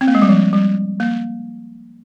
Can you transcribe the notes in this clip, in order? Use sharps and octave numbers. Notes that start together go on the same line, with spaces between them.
C4
A#3
G#3
G3
F3
G3
A#3